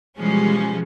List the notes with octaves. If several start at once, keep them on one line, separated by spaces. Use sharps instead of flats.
B2 E3 F3 G3 G#3 C#4